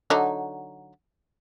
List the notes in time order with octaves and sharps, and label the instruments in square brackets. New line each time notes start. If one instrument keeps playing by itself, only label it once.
[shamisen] D3 F#3 D#4